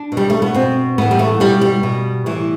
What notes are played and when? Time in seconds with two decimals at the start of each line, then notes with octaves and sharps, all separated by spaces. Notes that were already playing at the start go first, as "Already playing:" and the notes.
Already playing: D4
0.12 B2
0.17 G3
0.30 A3
0.42 B3
0.54 B2 C4
0.98 A2 E3 B3
1.11 G3
1.19 A3
1.40 B2 G3
1.61 G3
1.83 B2
2.26 A2 E3